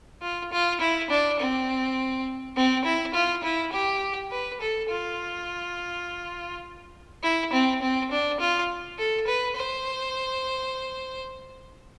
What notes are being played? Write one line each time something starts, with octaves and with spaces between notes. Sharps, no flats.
F4
F4
E4
D4
C4
C4
E4
F4
E4
G4
B4
A4
F4
E4
C4
C4
D4
F4
A4
B4
C5